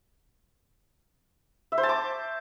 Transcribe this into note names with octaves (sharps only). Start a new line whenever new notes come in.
E5
C5
A5
D6